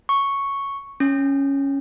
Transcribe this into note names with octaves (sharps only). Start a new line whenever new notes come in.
C#6
C#4